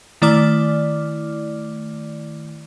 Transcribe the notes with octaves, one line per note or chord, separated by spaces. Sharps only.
D#3 A3 E4 D5 D6 F6